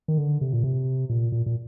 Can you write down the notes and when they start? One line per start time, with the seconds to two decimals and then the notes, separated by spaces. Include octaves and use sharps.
0.08 D#3
0.17 D3
0.41 C3
0.52 A#2
0.63 C3
1.09 A#2
1.32 A#2
1.46 A#2